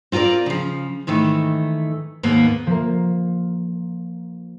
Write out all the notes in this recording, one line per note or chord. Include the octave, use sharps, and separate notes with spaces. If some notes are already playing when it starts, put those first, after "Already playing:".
C4 F4 A4 A#4 D5
C#3 F3
G#2 D#3 E3 A3
D#2 G#2 A#3 B3
F3 A#3